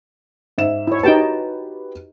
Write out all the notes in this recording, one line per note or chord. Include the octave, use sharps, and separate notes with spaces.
G#2 E5 E7
E4 C#5
D#4 F#4 G4 B4 G5 A5